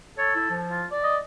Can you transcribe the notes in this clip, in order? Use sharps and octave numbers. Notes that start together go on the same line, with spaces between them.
A4 C#5
E4
F3
F4
D5
D#5